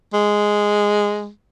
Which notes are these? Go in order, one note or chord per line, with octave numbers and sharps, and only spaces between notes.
G#3